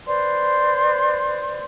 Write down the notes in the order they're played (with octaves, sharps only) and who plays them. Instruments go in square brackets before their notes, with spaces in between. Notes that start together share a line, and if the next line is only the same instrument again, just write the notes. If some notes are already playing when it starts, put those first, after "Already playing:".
[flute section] B4 C5 D5 C6